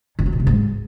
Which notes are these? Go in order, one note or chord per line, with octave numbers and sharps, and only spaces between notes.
D#3
F#3
A#2
C3
G#2